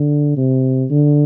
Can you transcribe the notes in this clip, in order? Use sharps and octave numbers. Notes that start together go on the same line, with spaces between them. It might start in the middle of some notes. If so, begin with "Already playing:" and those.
Already playing: D3
C3
D3